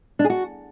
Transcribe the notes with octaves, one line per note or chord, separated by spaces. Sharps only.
D4
G#4
F#4